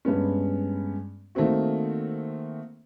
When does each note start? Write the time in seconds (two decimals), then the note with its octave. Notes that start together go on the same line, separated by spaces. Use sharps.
0.05 G2 G#3 B3 C#4
1.35 D#3 A3 A#3 C4 F#4